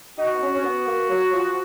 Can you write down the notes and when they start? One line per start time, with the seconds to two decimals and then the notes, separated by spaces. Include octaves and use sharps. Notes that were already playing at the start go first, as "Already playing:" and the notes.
0.19 D#4 F#4
0.34 B3
0.42 C#4
0.55 C#4
0.64 B3
0.87 A#3
1.10 F#3
1.33 F3